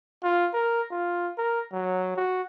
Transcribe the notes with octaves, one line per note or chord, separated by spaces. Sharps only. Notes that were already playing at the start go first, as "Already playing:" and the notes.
F4
A#4
F4
A#4
F#3
F#4